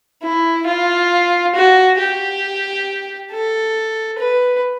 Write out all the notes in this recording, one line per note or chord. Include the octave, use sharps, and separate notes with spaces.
E4
F4
F#4
G4
A4
B4